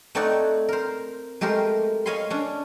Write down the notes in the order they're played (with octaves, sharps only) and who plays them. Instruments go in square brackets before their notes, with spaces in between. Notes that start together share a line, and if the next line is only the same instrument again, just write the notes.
[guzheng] A3 C4 D#4 C#5 D5 F#5
A#4 C5
G#3 A3 G4 A#4 C5
C#5 D#5 F5 G#5 B5 C6
C#4 D4